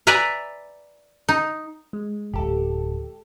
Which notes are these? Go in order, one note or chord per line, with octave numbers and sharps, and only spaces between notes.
B4 D5 E5 G#5 A#5
D#4
G#3
D1 G#1 G4 A4